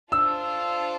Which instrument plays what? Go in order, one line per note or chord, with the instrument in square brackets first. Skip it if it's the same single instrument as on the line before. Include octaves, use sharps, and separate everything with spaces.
[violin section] D4 F4 A4 C5 [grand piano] E6